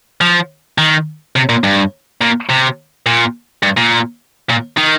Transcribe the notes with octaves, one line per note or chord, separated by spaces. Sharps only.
F3
D#3
C3
A#2
G2
A#2
C3
A#2
G2
A#2
A#2
D#3